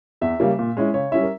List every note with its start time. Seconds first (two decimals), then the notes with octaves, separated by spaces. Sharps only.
0.21 E2 E5
0.40 C#3 G3 A#3
0.59 A#2
0.77 G#3 C#4 E4
0.94 C#3 C#5
1.12 G3 C#4 E4 E5
1.23 A#4